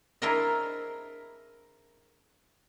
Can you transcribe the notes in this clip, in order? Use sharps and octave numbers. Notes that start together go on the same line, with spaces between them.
D4 E4 G#4 A#4 C5 D#5